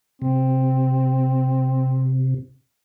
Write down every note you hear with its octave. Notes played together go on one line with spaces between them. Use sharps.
C3 C4